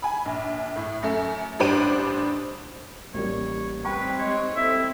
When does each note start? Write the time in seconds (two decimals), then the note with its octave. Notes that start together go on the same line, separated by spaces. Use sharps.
0.02 G#5 B5
0.25 A#1
0.76 A2
1.03 F#2 A3
1.59 A1 G3 D4 C5 D7 D#7
3.14 A1 G3 A#3 C#5
3.85 G3 C4 D#4 B4 G5 B5 C#6
4.19 G#3 C#5
4.56 C4 E4 A4 E5